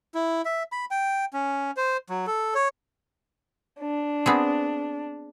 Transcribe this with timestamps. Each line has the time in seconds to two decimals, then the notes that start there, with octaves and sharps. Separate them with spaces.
0.14 E4
0.45 E5
0.72 B5
0.91 G5
1.33 C#4
1.77 C5
2.10 F#3
2.27 A4
2.55 C#5
3.80 D4
4.26 B3 C4 G#4